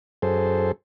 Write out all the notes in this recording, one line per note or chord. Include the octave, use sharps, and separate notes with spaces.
F#2 G#4 A4 C5